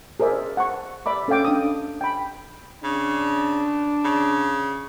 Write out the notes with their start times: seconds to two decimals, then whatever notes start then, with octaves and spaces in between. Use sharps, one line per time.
0.20 G#4 A#4 C5 D5 E5
0.57 F#5 A5 C#6
1.06 D5 E5 B5 D6
1.28 C#4 A4 C#5 F5 G5 D6
1.45 D4 D#6
2.01 G5 B5
2.84 C#3 D4
4.04 C#3